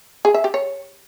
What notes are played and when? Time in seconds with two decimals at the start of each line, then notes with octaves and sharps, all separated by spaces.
0.25 G#4
0.34 E5
0.44 G4
0.54 C#5